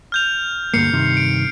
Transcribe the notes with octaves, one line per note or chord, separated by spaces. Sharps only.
F6 G6 F7
D2 G2 A#3 C7 C#7
G2 C3 D#3
D7